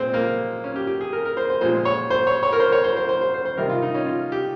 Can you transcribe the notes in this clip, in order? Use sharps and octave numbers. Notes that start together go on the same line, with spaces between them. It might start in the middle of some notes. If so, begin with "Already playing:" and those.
Already playing: A#2 G#3 C4
A#3
C#4
G4
G4
G#4
A#4
A#4
C5
C5
A#2 F3 G#3 C5
C#5
C5
C#5
C#5
A#4
C5
C#5
C5
C5
C5
C5
C5
C5
C3 D#3 G3 A#4
F4
D#4
C#4
F4
G4